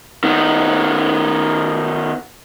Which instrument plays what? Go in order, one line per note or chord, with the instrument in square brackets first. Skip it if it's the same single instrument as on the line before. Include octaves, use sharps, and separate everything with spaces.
[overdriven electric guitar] D#3 B3